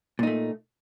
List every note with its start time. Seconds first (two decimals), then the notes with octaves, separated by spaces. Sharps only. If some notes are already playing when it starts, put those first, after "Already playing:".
0.19 A#2
0.23 D#4
0.27 A3